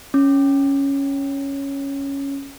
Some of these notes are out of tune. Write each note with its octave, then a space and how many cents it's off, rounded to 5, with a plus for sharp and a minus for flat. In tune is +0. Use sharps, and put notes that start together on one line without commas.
C#4 +0 C#5 +0